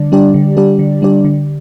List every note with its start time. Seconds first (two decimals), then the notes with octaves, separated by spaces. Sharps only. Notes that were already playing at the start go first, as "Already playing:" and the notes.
Already playing: D3 G3 D4 D5
0.12 G3 D4 G4 D5
0.34 D3
0.57 G3 D4 G4 D5
0.79 D3
1.02 G3 D4 G4 D5
1.25 D3